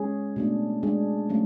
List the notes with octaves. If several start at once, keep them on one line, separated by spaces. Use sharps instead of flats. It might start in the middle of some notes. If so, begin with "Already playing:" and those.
Already playing: G#3 C#4 G#4
B2 A3 D4
G#3 D4 G#4
F#3 A3 C#4